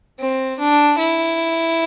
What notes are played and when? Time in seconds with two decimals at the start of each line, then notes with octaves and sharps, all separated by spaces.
0.20 C4
0.59 D4
0.99 E4